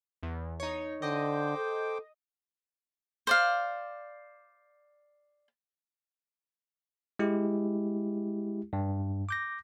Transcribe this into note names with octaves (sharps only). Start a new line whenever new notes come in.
E2
D#4 C#5
D3 C5 D#5 G5 D6
A4
C5 D5 F5
G#3 E4 G4
G2
D6 G6 A#6